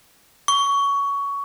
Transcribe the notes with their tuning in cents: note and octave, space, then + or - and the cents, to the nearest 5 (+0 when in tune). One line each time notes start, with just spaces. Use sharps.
C#6 +15